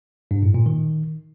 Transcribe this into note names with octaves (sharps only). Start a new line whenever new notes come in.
G2
A2
A#2
D#3